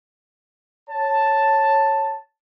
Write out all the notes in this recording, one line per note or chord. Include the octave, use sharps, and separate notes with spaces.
C#5 A5